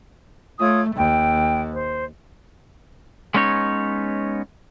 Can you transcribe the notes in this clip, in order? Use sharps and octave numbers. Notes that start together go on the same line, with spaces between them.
A3 F4 C#5 D#6
D#2 G5
C5
G#3 B3 C#4 D#4 C#5